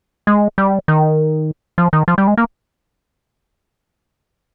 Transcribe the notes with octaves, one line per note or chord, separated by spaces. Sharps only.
G#3
G3
D#3
F3
D#3
F3
G3
G#3
A#3